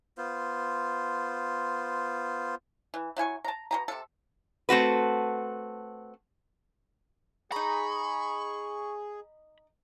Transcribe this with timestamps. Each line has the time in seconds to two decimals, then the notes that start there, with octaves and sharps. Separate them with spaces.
0.18 B3 F4 C5
2.94 E3
3.17 F#3 E4 G#5 C#6
3.44 A5 A#5
3.71 B2 G#4 A#5
3.88 C3 A4
4.69 A3 C4 F#4 B4
7.52 D#4 G#4 A#5 B5 C#6